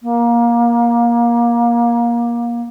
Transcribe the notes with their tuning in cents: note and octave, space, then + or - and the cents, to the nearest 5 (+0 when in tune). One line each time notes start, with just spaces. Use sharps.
A#3 +20